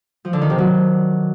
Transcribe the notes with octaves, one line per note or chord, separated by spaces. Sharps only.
F3
D3
D#3
C3
F#3